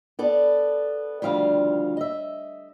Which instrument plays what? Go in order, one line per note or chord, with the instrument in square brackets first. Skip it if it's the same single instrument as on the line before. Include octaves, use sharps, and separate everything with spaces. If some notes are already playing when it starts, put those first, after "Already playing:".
[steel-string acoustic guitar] B3 A4 D5
D2 D#3 F3 G3 F4 F5
D#5 E5